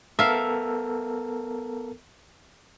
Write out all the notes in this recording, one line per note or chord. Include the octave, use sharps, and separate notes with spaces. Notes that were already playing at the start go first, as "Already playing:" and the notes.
B3 A4 A#4 E5 F5